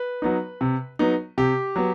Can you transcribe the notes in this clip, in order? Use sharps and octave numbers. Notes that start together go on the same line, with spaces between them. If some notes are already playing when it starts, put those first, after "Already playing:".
Already playing: B4
F#3 B3 D#4
C3
F#3 B3 D#4
C3 G4
F#3 B3